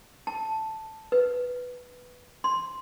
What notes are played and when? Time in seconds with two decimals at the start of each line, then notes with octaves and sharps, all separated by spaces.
0.27 A5
1.12 B4
2.44 C6